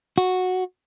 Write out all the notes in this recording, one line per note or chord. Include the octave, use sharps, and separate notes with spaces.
F#4